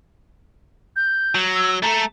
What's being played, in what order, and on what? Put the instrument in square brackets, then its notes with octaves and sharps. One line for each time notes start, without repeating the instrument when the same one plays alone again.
[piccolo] G6
[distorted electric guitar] F#3
[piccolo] E6
[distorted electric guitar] A3 A4 [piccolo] A#5